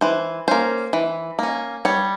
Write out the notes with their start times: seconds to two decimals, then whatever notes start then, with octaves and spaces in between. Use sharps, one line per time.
0.01 E3 C5
0.48 A#3 C#4 C5
0.93 E3
1.39 A#3 C#4
1.85 G3 C#5